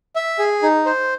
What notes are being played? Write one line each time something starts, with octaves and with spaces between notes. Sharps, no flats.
E5
G#4
D#4
C5